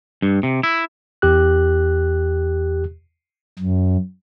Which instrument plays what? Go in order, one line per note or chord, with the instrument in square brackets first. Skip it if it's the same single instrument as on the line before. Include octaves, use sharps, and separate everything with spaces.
[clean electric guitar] G2
C3
E4
[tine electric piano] E2 G4 F#6
[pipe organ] F#2